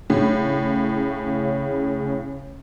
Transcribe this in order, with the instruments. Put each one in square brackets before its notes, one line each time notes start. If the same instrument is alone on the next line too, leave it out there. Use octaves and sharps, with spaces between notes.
[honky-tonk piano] A2 [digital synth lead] C#3